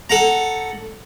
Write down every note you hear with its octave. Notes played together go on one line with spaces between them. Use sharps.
A4 F#5 A#5